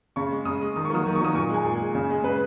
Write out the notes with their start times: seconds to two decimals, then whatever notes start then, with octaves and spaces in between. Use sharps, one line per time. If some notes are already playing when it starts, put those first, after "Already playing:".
0.16 C#3 C#6
0.31 G#3
0.45 C#3 D#6
0.61 G#3
0.76 D#3 D#6
0.85 C#6
0.90 F#3 A#3 D#6
1.06 D#3
1.15 C#6
1.21 F#3 A#3 D#6
1.35 A#2 C#6
1.50 G#3 G#5
1.64 A#2
1.80 G#3
1.95 C#3
2.10 G#3
2.23 C#3 B4